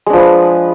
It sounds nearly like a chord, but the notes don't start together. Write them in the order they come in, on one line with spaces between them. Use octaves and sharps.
G#3 D4 F3 B4